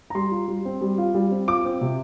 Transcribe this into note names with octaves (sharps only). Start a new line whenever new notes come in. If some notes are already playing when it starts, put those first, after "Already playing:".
A#5
G3 C6
F4
G3
C4
G3
F4
G3
C4
F4 D6
C4
C3